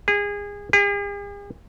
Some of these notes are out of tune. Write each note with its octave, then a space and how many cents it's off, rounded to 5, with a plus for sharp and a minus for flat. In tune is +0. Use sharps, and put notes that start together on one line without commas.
G#4 -25
G#4 -45